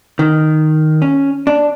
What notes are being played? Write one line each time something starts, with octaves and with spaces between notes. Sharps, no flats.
D#3
C#4
D4